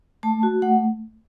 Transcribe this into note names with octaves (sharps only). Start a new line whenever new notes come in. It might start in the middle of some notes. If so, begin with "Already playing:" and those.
A3 A5
F#4
A3 F#5